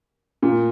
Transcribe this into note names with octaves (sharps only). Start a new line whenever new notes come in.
A#2